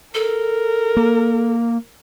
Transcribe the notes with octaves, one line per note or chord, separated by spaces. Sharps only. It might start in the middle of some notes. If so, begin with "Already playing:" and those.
A4 A#4
A#3